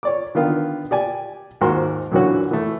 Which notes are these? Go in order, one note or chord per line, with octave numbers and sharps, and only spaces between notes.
C#5 D5 D6
D3 D#3 B3 F4
G4 D5 G#5
D#2 G#2 F#4 A#4 C5 C6
F#2 A#2 D3 E3 C#4 F#4
E3 A3